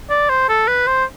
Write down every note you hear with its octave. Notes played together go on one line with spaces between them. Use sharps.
D5
C5
A4
B4
C5